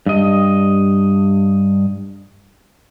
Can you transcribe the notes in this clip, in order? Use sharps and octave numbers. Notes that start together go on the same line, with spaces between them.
G2 D#5